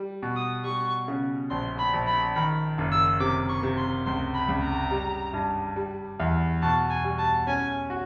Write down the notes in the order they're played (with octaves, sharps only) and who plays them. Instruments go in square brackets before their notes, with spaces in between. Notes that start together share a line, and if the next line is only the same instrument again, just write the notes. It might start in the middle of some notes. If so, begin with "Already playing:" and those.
Already playing: [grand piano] G3
B2
[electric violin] D#6
[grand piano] G3 [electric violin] C#6
[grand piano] C#3
[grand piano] A#1 [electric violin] C6
[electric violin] B5
[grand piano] A#1
[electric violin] B5
[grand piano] D#3 [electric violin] B5
[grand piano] F#1
[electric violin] E6
[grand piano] C3 [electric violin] D6
[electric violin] C#6
[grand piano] C3
[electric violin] C6
[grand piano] C#2 [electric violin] C6
[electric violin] B5
[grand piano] C#2
[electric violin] A#5
[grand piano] G3
G2
G3
E2
[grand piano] B2 [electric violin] A5
[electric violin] G#5
[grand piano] G3
[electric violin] A5
[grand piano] C#4 [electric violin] G#5
[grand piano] F#4